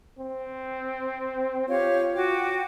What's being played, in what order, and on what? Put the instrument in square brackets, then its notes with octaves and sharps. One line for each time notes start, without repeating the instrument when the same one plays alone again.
[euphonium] C4
[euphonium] F4 [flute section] G4 C#5 F5
[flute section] F#4 G5 D6